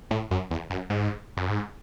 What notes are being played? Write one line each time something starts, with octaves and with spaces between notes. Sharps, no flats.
A2
F#2
E2
F#2
G#2
F#2
G#2